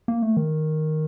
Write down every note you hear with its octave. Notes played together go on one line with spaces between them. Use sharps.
A#3
A3
D#3